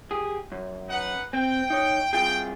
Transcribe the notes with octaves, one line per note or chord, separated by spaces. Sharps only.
G4 G#4
F#2
D#4 B4 F#5
C4 G5
D#4 C#5 D#5
C2 F4 G#4 G5